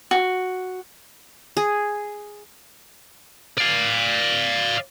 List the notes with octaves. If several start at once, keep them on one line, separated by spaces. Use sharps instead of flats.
F#4
G#4
D5 F5